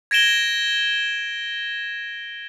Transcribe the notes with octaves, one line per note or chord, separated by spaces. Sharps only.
G#6 A#6 D7 E7 G7